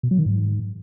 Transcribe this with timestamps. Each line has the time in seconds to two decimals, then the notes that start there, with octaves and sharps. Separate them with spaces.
0.03 B2
0.11 F#3
0.18 D#3
0.26 G#2